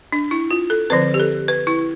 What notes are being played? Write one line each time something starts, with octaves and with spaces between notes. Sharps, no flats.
D4
E4
F4
A4
D3 F3 C4 B4
G4
A4
B4
E4